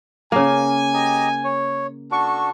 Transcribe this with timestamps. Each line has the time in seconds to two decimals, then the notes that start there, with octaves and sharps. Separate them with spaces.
0.32 C#3 A#3 G#5
0.94 G4 D#5 A#5
1.44 C#5
2.11 D4 F#4 A4 C#6